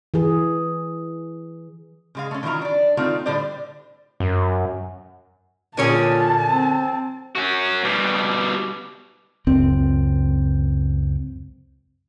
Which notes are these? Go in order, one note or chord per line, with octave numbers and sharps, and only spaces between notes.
E3 G#4
C#3 G#3 F5
A3 C#4
D#3 E3 F#3 F4 E5 A#5
D4 D5
D#3 A3 C4 D#4 F4
A2 D3 G3 C5 D5
F#2
A#2 D3 C#4 G#4 A#4 C#5 A5
C4
C#4 F#4
B2 G3
C#2 F#2 C4